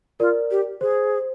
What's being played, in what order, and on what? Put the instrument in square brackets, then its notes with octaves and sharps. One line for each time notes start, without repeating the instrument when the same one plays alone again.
[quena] F4 [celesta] A#4 D5
[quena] G4
[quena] G#4 [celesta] C5